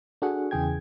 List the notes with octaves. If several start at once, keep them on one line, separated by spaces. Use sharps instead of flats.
D4 F#4 G#4 A4 F#5
E2 C#3 E3 G#4 G5 G#6